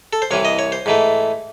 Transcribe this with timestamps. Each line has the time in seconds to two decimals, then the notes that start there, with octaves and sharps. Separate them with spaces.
0.13 A4
0.22 C5
0.31 C2 C3 E3 C#5
0.45 D#5
0.59 C#5
0.72 C5
0.86 G#2 E3 A3